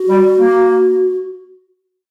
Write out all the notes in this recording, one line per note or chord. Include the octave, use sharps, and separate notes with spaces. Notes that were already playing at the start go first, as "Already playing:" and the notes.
Already playing: F#4
G3
A#3